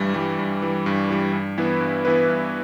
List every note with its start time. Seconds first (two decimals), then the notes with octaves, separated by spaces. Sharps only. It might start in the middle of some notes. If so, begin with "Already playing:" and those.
Already playing: G2 E3 G3
0.14 E3 G3
0.39 G2
0.62 E3 G3
0.86 G2
1.10 E3 G3
1.33 G2
1.58 E3 B3 E4 B4
1.80 G2
2.05 E3 B3 E4 B4
2.29 G2